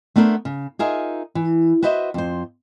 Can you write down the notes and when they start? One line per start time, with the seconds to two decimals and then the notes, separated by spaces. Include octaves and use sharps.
0.16 A3 B3 D4 E4 A#4 C5
0.45 C#3
0.79 D#4 F4 G#4 A#4 E5
1.35 E3
1.83 F#4 B4 C5 D#5 E5
2.14 F2 C5